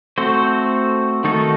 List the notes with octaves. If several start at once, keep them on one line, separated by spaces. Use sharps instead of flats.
A3 C4 F#4 A4 C5
D#3 A3 D#4 F#4 A4